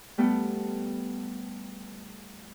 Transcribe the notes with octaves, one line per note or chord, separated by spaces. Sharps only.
G3 A3 B3 A4